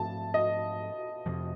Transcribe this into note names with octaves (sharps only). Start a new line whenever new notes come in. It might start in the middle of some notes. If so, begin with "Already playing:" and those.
Already playing: G#2 F3 A3 C4 A5
D#5
F2 C3 F3